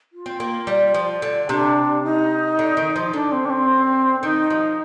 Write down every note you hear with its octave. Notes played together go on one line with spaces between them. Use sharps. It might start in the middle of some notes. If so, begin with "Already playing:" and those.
F4
C4
A#3
G3
F3
D3
C3 D4
D#4
D3
D#3
F3
D3 D4
C4
D4
C4
D#3 D#4
F3